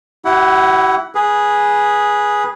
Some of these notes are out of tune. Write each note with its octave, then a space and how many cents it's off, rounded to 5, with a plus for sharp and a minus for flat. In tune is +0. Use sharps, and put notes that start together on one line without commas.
E4 +0 G4 -45 F#5 +10
G#4 +0 B4 -15